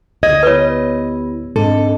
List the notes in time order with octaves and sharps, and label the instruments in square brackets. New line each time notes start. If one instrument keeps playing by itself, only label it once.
[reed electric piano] D2 G#6 [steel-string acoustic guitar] D#5
[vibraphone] B3 E4 G4 [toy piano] B4 C#5
[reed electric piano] G#2 [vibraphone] C4 D4 D#5 [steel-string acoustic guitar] A4